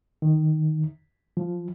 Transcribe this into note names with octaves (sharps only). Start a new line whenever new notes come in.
D#3
F3